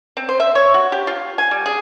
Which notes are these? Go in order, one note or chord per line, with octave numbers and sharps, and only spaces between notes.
C4
C5
E5
C#5
F#4
G4
F4
G#5
G3
G#4